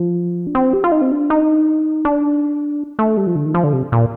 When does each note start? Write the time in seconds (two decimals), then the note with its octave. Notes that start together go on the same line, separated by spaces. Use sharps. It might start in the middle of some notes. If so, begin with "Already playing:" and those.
Already playing: F3
0.47 D4
0.55 C4
0.73 G4
0.84 F4
0.92 D#4
1.02 C4
1.11 D4
1.30 D#4
2.05 D4
2.99 A3
3.17 G3
3.27 F3
3.35 D3
3.45 D#3
3.54 F3
3.64 D3
3.73 C3
3.92 A#2